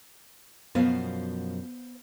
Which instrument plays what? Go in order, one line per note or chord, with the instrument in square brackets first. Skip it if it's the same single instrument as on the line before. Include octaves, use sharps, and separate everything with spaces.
[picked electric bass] F#2 B2 F3 [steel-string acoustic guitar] B3 C5 F5